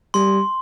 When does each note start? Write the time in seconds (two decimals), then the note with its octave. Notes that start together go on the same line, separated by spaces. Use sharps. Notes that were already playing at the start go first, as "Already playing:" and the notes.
0.14 G3 C6